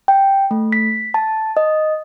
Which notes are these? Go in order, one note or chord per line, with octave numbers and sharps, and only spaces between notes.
G5
A3
B6
A5
D#5